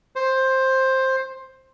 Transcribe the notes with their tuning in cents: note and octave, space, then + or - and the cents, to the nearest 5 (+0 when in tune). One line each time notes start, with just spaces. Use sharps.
C5 +10